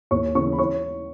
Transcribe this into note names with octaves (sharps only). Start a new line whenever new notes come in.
D#2 C#5 C#6
C#3 E3 C#5 C#6
B5
C#5 C#6